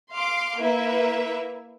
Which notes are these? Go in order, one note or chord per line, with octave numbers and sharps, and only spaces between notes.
F5 C6 D6
A#3 E4 B4 E5